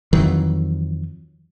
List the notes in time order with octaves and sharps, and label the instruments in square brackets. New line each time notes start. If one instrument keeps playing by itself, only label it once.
[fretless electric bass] F2 D#3 E3 F#3